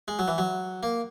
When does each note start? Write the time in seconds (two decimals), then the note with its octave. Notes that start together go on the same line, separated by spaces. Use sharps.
0.08 G#3
0.19 F#3
0.28 E3
0.38 F#3
0.83 A#3